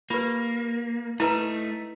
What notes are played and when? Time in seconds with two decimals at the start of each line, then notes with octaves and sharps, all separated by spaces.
0.10 A#3 F4 G4 B4
1.20 A3 D#4 E4 B4 A#5